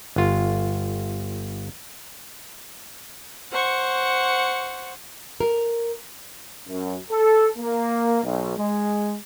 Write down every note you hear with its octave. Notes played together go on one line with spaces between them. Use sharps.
G1 F4
C5 F#5 C#6
A#4
F#2
A4
A#3
B1
G#3